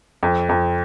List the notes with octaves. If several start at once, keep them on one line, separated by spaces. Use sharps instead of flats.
F2
F2